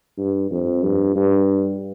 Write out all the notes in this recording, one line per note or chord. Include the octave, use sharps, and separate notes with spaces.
G2
F2
G2
G2